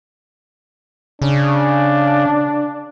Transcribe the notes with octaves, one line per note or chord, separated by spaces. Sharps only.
C#3 D4